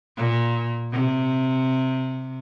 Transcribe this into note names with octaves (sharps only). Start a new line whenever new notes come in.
A#2
C3